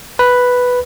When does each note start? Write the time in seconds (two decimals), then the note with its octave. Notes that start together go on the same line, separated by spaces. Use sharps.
0.19 B4